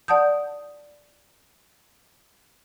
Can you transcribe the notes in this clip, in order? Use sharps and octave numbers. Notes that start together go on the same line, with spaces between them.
D5 F#5 A5 D#6 G6